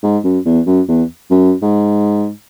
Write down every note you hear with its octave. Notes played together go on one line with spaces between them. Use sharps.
G#2
F#2
E2
F#2
E2
F#2
G#2